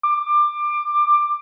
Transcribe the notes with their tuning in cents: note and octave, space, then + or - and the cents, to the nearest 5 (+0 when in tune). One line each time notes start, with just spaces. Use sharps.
D6 +20